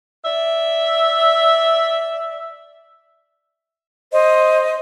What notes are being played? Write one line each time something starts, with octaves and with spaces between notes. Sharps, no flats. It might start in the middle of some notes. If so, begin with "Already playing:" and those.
D5 E5
C5 D#5